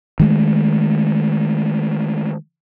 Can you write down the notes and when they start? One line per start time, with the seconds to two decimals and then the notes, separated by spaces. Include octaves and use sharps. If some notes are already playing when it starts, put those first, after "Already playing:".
0.20 D#3 G#3 A3